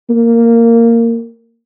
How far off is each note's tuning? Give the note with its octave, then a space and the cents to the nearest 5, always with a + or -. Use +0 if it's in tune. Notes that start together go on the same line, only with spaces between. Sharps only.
A#3 -10